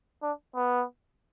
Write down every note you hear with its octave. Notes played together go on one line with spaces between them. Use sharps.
D4
B3